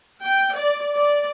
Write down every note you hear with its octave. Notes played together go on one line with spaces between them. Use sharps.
G5
D5
D5